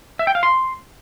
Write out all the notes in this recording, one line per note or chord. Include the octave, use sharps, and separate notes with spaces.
E5
G5
F5
C6